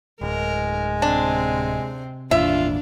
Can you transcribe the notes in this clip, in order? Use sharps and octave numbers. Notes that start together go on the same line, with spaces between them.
D1 G#3 A#4
C3 C4 D4
G#1 E2 A#2 D4 F4 E5